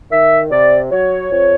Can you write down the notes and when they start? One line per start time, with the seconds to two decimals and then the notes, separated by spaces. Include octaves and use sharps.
0.11 D#3 E5
0.51 C3 D5
0.91 F#3 C#5
1.31 F2